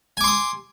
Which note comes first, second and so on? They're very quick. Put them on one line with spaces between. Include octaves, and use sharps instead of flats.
G#5 D6 C6 D#6